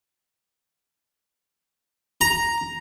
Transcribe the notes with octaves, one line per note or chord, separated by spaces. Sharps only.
A#5